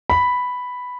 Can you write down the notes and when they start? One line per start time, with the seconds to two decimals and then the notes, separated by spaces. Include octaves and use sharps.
0.10 B5